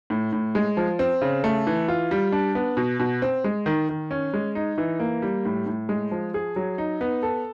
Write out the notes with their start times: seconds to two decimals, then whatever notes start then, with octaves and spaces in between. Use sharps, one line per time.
0.10 A2
0.32 A2
0.55 G#3
0.77 F3
0.99 C4
1.21 C#3
1.44 A3
1.67 E3
1.88 F4
2.11 G3
2.32 D4
2.55 B3
2.77 B2
3.00 B2
3.22 C4
3.44 G#3
3.66 D#3
3.89 D#3
4.11 C#4
4.34 G#3
4.55 D#4
4.78 E3
5.00 A#3
5.22 G3
5.45 A2
5.66 A2
5.89 G#3
6.11 F3
6.34 G#4
6.56 F#3
6.78 D#4
7.01 B3
7.23 A4